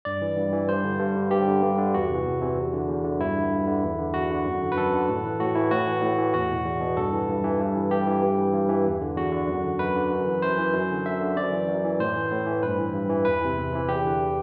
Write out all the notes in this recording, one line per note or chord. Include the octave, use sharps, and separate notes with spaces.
G2 D5
E3
G2
E3
G2 C5
D3
G2
D3
G2 G4
D3
G2
D3
E2 F#4
C3 E3
E2
C3 E3
E2
D3
E2
D3
G2 E4
D3
G2
D3
E2
D3
E2 F#4
D3
F#2
D3
B4
F#2 A4
D3
A2
E3
A2 F#4
E3 E4
A2 F#4
E3
A2
E3
E2 F#4
B2
E2
B2
G2 A4
E3
G2
E3
G2
E3
G2 G4
E3
G2
E3
G2
E3
E2
D3
E2 F#4
D3
F#2
D3
F#2 B4
D3
F#2
E3
F#2 C5
E3
F#2
D3
F#2 E5
D3
F#2 D5
E3
F#2
E3
A2 C5
E3
A2
E3
G2 B4
E3
G2
E3
E2 B4
C3 E3
E2
C3 E3
E2 G4
D3